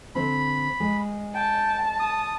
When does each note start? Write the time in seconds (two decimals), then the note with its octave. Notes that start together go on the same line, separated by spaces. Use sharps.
0.15 D3 C4 C5 B5
0.80 G#3
1.35 G5 A5
2.00 D#6